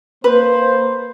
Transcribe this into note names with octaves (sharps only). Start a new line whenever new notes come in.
A#3 B4 C5